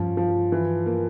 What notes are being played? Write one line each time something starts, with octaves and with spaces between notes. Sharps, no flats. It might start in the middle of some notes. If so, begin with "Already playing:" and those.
Already playing: G2 F3 C#4
F3
E3
A#3